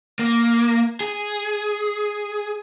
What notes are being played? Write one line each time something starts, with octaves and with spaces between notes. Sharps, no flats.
A#3
G#4